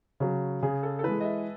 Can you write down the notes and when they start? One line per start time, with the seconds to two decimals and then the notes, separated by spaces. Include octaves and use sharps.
0.20 C#3 F#3
0.62 C#3 G#4
0.83 A4
0.99 A4
1.04 E3 G#3 B4
1.20 D#5
1.24 E5